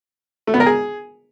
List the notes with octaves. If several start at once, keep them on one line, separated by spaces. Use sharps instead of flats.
A3
B3
A#4
G#4